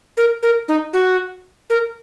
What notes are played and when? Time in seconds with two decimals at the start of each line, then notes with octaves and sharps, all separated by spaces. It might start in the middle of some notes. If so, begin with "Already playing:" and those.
0.17 A#4
0.43 A#4
0.68 D#4
0.93 F#4
1.70 A#4